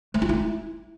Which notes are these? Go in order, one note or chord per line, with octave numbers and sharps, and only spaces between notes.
A3
F4
E4